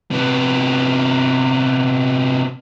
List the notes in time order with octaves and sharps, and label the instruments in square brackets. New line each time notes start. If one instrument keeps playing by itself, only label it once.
[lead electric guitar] C3 B3